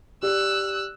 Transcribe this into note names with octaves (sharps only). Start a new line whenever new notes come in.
G4 D5 E6 F#6